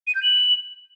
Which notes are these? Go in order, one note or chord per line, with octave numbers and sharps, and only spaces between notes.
D#7
G6
F#7